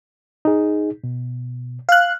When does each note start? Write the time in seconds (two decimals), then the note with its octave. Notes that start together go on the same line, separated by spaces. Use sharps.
0.45 D#4 G#4
1.04 B2
1.89 F5 F#6